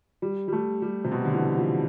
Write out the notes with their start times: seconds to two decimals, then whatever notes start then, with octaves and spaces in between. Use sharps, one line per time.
0.22 G3
0.48 G3
0.52 A3
0.82 G3
1.04 C3
1.12 B2
1.25 D3
1.34 E3
1.57 F3